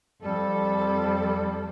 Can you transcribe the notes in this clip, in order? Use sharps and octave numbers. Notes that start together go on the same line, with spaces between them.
F2 G3 A4